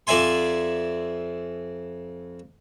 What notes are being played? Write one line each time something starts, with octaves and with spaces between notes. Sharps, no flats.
F2 D5 E5 G#5 C6